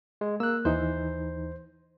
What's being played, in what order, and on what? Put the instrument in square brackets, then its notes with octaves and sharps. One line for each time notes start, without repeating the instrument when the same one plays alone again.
[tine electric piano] G#3
[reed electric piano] A#3 F#6 [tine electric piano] E6
[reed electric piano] D#2 E3 D#4 [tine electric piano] C5